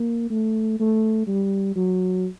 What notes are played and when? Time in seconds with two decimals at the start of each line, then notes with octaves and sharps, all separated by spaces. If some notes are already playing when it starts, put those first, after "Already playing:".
Already playing: A#3
0.30 A3
0.80 A3
1.27 G3
1.76 F#3